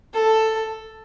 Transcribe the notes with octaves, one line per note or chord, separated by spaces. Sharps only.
A4